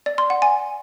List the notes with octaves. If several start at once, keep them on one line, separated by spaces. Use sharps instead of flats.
D5
C6
F#5
G#5